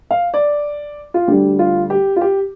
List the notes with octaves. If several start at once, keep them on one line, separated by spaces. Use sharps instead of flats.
F5
D5
F4
D2 D3 G3 G4
F4
G4
F4
G4